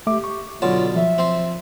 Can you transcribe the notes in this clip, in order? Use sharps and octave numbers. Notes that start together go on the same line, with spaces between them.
A3 G4 E5 D6
C#6
B1 D3 F4 C#5 A5
F3 E5
C4 C6